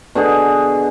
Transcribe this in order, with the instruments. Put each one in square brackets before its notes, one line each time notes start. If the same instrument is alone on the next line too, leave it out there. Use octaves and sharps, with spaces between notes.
[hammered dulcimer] B2 D3 G#4